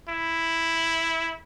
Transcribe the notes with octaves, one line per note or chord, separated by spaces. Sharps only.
E4